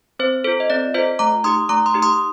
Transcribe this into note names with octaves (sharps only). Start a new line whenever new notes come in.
C4 C5
F4 A4 C5
D#5
C4 D5
F4 A4 C5 D#5
A3 A#5 D6
D#4 G4 C6 D#6
A3 A#5 D6
C6 D#6
D#4 G4
C6 D#6